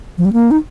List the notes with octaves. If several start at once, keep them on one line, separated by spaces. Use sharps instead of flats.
F3
G3
A#3
D#4